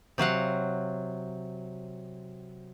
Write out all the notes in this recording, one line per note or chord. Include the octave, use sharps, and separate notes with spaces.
C3 F#3 F5 F#5